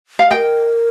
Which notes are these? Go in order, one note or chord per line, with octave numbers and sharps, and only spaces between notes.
F5
A#4 D#5 G5